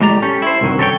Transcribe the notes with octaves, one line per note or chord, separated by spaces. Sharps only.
A2 G#3 G4 D5 A#5
C#4 G4 A4
E4 C5
C2 G2 D#3 F#3
C#4 A4 A#4 C#5 G5